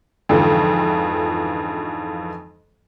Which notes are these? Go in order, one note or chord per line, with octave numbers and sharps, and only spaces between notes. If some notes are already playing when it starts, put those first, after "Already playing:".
F2 G#2 D3 E3 F3